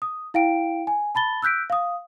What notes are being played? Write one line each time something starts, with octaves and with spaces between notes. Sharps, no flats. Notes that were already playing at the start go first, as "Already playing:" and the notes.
D#6
E4 F5 G5 D7
G#5
A5 B5 A6 G7
E6 F#6 G6 B6 D7
F5 D#6